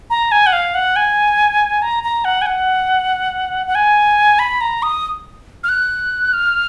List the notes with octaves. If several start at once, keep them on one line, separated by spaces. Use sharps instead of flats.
A#5
G#5
F#5
F5
F#5
G#5
A#5
A#5
F#5
G#5
F#5
F#5
G#5
B5
A#5
D#6
F6
F#6
F6